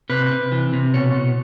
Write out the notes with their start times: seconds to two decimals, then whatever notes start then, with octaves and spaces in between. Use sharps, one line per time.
0.09 C3 B4
0.31 C3
0.52 E3
0.73 C3
0.94 B2 C#5
1.15 B2